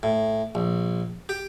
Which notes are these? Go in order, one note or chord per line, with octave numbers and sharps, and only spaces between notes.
A2
A#1
G4